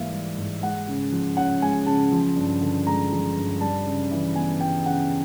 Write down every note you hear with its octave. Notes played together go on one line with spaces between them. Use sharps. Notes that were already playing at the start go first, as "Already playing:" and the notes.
Already playing: G#2 E3 G3 A#3 E5 F5
G3
G#2
G#3 F#5
C#3
F3
C#4 F#5
G#3 G#5
C#3 A5
F3
G2
D3
G#3 A#5
F3
G2
G3 A5
C#3
E3
B3 G#5
G3 G5
C#3 F#5